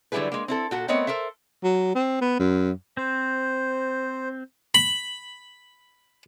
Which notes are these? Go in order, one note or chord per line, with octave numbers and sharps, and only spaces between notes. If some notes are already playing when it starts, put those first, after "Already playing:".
D3 F#3 G3 E4 G#4 B4
G#3 A#3
C4 E4 A4
A#2 F#4 A4
A3 B3 C4 A#4 C#5 D#5
A4 A#4 C5 E5
F#3
C4
B3
F#2
C4 C5
B5